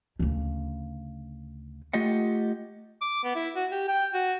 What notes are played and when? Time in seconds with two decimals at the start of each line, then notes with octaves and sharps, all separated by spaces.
0.19 D2 C#3
1.93 A3 F4 G4 D#5 F#5
3.01 D6
3.24 B3
3.35 E4
3.56 F#4
3.72 G4
3.88 G5
4.14 F#4